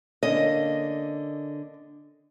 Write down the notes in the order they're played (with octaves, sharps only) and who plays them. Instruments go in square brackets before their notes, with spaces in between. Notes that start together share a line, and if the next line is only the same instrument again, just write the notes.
[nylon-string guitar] D3 A#3 C#4 [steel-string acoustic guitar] D#5